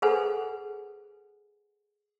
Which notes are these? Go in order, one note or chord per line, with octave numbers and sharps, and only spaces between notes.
G#4 A4 B4 C5 F#5 G#5